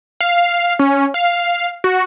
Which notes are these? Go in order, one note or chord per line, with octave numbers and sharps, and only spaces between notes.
F5
C#4
F5
F#4